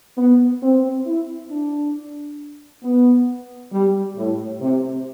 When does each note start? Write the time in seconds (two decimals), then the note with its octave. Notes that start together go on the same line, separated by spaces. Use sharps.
0.17 B3
0.62 C4
1.06 E4
1.50 D4
2.83 B3
3.72 G3
4.17 A2
4.61 C3